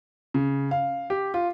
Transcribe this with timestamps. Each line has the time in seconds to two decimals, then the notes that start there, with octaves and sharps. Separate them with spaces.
0.34 C#3
0.71 F5
1.10 G4
1.34 F4